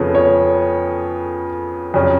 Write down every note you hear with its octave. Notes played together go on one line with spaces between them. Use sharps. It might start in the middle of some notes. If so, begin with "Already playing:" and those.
Already playing: F2 C#3 F3 B3 G#4 A4 C#5
C#5
F2 C#3 F#3 C#4